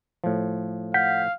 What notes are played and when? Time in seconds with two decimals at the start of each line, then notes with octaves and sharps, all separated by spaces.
0.24 A2 F3
0.94 F5 F#5 G6 B6